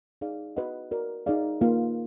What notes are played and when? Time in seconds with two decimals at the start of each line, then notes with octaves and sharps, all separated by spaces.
0.21 D#4 G#4 D5 F5
0.56 F#4 B4 D#5 F#5
0.91 F#4 A#4 D5
1.26 D#4 G#4 D5 F5
1.61 A#3 F4 B4 F5